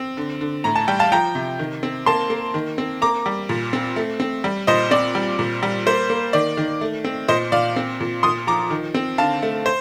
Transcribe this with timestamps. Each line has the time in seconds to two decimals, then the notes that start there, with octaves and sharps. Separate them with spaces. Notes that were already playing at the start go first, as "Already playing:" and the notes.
Already playing: C4
0.17 D3
0.41 D3
0.64 A2 A#5
0.76 A5
0.88 G3 G5
0.99 F5 A5
1.12 F3 G5 A#5
1.35 C3
1.59 D#3
1.83 C4
2.06 A#3 A5 C6
2.30 A#3
2.54 D#3
2.78 C4
3.02 A#3 A#5 D6
3.26 G3
3.49 A#2
3.73 C4
3.96 A3
4.20 C4
4.44 G3
4.67 A#2 C5 D#5
4.91 C4 D5
5.15 G3
5.39 A#2
5.63 G3
5.86 A#3 C5
6.10 A#3
6.33 D#3 D5
6.57 D#3
6.81 A3
7.04 C4
7.28 A#2 C5 D#5
7.52 A#2 D5 F5
7.76 C4
8.00 A#2
8.23 A#2 C6 D#6
8.47 F3 A#5 D6
8.70 D#3
8.95 C4
9.18 D3 F5 A5
9.42 A3
9.66 C5